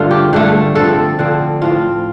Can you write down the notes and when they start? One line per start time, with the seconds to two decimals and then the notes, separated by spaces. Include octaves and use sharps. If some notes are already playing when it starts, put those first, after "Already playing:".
Already playing: G2 D3 A3 F4
0.11 G4
0.33 G2 D3 A3
0.75 D3 F3 C4 A4
1.19 D3 F3 C4
1.62 A2 F3 C4 F4